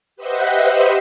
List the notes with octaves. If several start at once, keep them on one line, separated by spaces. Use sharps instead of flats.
G4 B4 C5 D#5 E5 F#5